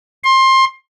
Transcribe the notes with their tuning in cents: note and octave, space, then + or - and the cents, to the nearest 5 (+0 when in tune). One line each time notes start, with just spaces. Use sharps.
C6 +20